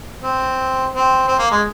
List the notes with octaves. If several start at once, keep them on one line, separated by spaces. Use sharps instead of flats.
C4
C4
C4
A#3
G#3